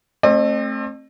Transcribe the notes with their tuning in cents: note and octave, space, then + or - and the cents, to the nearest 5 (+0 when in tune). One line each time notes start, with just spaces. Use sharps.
A3 +0 C4 +30 D#5 -45